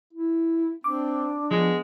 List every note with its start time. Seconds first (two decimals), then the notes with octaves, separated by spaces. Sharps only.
0.13 E4
0.84 C4 D4 D6
1.51 F3 G#3 B3